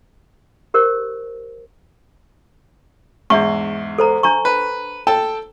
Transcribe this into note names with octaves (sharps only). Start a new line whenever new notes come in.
G4 A#4 C5
E2 G#2 D4 E5 C#6
A4 C5 A#5
D4 A#5 C#6
B4
A4 G5 A5